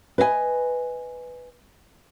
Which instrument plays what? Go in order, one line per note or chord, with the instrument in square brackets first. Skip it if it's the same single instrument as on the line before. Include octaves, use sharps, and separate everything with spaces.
[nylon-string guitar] B4 D#5 E5 G#5